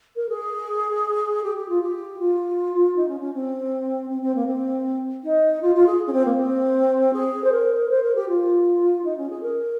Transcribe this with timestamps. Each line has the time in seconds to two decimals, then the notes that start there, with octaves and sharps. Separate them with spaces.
0.15 A#4
0.29 G#4
1.43 G4
1.56 G4
1.68 F4
1.81 G4
2.18 F4
2.95 D#4
3.08 C#4
3.20 C#4
3.33 C4
4.09 C4
4.21 C4
4.35 A#3
4.46 C4
5.23 D#4
5.61 F4
5.74 F4
5.86 G#4
6.06 C#4
6.12 C4
6.25 A#3
6.37 C4
7.13 G#4
7.44 C5
7.52 A#4
7.89 C5
8.02 A#4
8.15 G4
8.28 F4
9.04 D#4
9.17 C#4
9.30 G#4
9.42 A#4